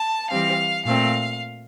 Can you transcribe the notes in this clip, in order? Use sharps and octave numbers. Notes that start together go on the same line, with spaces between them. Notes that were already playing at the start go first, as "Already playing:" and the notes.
Already playing: A5
E3 G3 C4 F5
A#2 A3 C4 F5